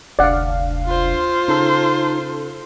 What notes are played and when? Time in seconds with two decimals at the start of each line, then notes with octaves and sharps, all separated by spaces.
0.19 F1 D2 D4 D5 F5 F#5
0.86 F4 C5
1.48 C#3 D#4 A4